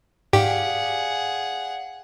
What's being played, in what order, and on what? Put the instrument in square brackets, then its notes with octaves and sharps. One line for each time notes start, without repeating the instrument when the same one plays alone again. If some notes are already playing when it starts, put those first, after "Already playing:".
[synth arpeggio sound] G#2 [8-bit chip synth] G4 [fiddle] G#4 F#5 [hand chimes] D5 F5 G#5